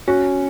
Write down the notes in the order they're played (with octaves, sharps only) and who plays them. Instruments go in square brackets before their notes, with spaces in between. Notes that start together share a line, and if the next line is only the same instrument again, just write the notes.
[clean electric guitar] C#4 [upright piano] F#4